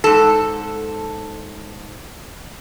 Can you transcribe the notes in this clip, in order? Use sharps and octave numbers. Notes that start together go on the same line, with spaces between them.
G#2 A4